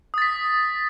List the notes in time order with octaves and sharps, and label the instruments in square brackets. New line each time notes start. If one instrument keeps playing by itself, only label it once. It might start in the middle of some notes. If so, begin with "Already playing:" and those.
[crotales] D#6
A6
B6